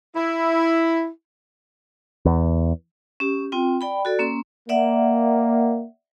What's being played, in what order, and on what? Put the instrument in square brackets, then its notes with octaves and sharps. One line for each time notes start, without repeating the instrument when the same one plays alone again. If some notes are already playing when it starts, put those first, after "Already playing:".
[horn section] E4
[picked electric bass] E2
[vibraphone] C#4 G4
C4 F4 G5
D5 G5 B5
F#4 A4 D5
A#3 C#4 C6
[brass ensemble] A#3 [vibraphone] D5 E5 F#5